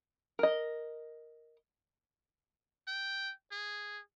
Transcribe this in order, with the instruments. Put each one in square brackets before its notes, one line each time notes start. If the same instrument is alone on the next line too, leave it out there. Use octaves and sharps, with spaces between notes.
[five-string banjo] A#4 D#5
[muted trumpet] G5
G#4